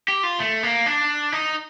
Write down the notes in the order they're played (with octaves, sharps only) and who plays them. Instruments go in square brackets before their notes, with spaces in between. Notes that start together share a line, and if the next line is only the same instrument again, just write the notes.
[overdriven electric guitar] G4
F4
A3
A#3
D4
D#4